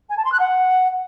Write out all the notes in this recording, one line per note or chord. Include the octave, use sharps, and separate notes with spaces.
G#5
A5
C6
F#6
F#5